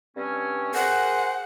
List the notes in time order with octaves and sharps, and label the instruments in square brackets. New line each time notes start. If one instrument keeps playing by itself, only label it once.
[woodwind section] G2 C4 C#4
[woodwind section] G#4 A#4 C5 [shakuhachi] F#5